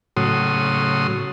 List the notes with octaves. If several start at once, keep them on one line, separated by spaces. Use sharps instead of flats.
A2 C#3 F#3 C6 D#6